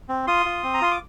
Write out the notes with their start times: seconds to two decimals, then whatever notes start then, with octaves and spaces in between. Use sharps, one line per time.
0.09 C4
0.27 F4 C6 D#6
0.46 F4
0.63 C4
0.74 A#5
0.81 F4 C6
0.91 D6